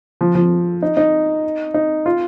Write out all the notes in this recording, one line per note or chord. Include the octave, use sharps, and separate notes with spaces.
F3
F3
D#4
D#4
D#4
F4